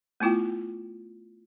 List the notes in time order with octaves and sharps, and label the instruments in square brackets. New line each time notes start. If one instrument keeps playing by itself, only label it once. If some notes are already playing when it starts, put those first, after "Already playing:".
[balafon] A3 B3 E4 F4 G5